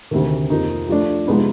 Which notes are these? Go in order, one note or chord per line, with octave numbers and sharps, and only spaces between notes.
D2 C3 D#3
F2 C3 F3 A#3 D#4
F3 A3 D4
C3 F3 G#3 B3 D#4